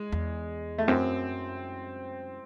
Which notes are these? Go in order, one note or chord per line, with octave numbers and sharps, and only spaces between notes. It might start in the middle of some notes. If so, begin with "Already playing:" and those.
Already playing: G#3
E2
A3
F#2 C4